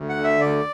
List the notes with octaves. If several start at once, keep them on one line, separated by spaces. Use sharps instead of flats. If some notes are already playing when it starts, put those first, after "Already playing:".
Already playing: D2
F#5
D3
E5
D2 D5